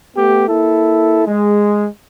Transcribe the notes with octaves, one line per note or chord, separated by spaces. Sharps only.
A3 B3 G4
A#3 E4 A4
G#3